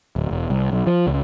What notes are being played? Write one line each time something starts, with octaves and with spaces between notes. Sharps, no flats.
D1
E1
C2
B1
F3
C#2